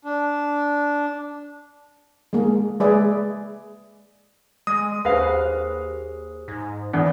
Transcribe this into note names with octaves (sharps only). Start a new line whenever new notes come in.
D4
G#3 A#3 G#4
G#3 G#4 B4 D5 E5
G#3 D#6
D#2 G#4 B4 C5 F5
G#2
E2 B3 D4